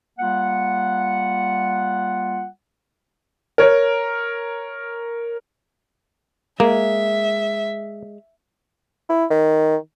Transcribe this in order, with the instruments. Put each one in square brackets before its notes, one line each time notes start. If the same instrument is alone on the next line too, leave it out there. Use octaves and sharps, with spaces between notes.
[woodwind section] G3 A#3 F4 F#5
[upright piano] A#4 C#5
[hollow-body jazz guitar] G#3 [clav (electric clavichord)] A#3 [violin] E5
[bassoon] E4
D#3